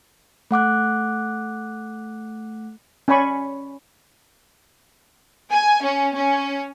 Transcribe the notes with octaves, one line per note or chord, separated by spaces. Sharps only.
A3 F#5 D6 F#6
C#4 D5 G#5 B5 C#6
G#5
C#4
C#4